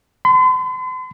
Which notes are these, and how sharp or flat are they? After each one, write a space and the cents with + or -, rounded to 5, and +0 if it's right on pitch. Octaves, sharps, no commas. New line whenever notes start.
C6 -45